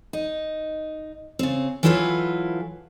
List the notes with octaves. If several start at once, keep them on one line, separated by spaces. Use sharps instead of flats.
D#4
C#3 C4
E3 F#3 E4 F4 A4 B4